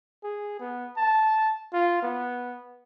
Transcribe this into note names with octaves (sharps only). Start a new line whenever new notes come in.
G#4
B3
A5
F4
B3